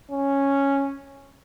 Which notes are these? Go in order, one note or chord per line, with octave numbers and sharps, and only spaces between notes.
C#4